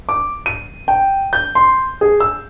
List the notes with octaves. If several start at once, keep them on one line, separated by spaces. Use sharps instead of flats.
D6
D#7
G5
G6
C6
G#4
E6